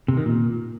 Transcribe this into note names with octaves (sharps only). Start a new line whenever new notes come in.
C3
D#3
A#2